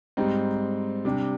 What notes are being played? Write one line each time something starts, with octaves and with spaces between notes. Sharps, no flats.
G#2 G3 C4 D#4
C3 G3 D4